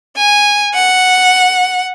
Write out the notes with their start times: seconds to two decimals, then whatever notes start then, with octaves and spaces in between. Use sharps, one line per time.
0.17 G#5
0.74 F#5